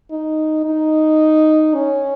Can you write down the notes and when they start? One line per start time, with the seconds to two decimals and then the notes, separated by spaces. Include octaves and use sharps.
0.11 D#4
0.65 D#4
1.74 C#4